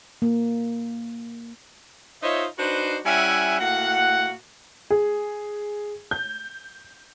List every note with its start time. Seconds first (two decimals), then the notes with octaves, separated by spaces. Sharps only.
0.22 A#3
2.23 D#4 F4 C5 C#5 D#5 E5
2.58 D4 D#4 F#4 B4 C5
3.05 G3 C#4 E4 E5 F#5 G#5
3.60 A2 A#3 F#4 F#5
4.90 G#4
6.11 G6